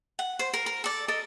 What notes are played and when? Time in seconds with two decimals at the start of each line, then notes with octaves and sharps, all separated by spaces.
0.19 F#5
0.39 C5
0.54 A#4
0.66 A#4
0.84 A4 D5
1.08 A4 A#4 D#5